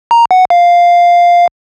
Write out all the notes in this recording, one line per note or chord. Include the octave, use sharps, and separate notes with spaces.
A#5
F#5
F5